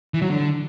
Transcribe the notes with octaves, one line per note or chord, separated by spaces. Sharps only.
E3
F#3
D3